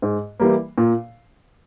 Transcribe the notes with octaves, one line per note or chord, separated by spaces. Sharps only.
G#2
E3 G3 A#3
A#2